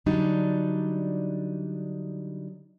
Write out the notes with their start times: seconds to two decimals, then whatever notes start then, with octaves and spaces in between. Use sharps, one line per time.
0.06 D3 F#3 G3 D4 D#4